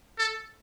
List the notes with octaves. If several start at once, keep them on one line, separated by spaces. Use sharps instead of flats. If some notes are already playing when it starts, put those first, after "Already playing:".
A4